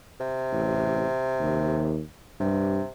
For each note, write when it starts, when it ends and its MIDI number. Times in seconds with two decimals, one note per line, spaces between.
0.21 1.97 48
0.52 1.06 33
1.40 2.01 39
2.40 2.81 43
2.40 2.90 48